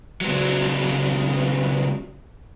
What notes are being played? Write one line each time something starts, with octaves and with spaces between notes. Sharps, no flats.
C#2 F#3